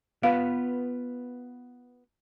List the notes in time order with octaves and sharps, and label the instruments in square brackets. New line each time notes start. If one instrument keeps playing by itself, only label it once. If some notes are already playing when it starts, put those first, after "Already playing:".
[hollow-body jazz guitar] B3 F4 B4 [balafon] F5